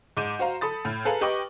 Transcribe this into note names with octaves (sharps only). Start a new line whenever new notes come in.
G#2 D6 G6 D#7 E7
F#4 C5 F5 A#5
A4 B5 D#6 A6
A2 F6
G#4 A4 B4 F5 A#5
G4 B4 D#5 G5 C#6 D6